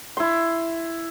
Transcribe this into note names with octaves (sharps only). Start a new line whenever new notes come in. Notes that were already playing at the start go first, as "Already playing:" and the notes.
E4 C6